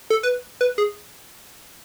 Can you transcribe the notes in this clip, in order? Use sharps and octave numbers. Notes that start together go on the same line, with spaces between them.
A4
B4
B4
G#4